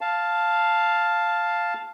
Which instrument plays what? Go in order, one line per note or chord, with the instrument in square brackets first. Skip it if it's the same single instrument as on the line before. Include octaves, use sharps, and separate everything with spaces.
[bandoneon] F5 A5